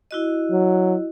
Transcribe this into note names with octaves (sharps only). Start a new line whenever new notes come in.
E4 F#4 D#5
F#3